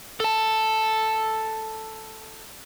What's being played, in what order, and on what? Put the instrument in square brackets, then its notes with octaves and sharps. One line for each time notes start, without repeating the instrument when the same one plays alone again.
[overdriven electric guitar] A4 A5